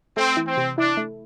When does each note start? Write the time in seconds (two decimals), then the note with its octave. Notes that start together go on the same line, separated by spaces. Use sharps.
0.17 A3 C4
0.37 E3
0.47 C4
0.57 C3
0.78 D4 E4
0.97 A3